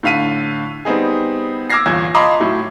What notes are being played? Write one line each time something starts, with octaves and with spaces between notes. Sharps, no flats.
A2 D3 F5 B6 D#7
G3 B3 C4 D#4 G#4
D6 E6 F6 G#6 A#6 C7
G1 E2 A#2 G#6
D#5 F5 A5 B5 C6 D6
A2 F#3 E4